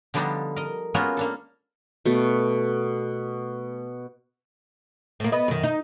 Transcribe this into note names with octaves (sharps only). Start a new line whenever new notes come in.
D3 F3 G3 B3 D4 D#4
A#4 D#5
G#3 A#3 B3 C#4 F4 F#4
A#3 D4 A4
B2 A3
A2 A#3
B3 D#5
F#2 D#3
D#4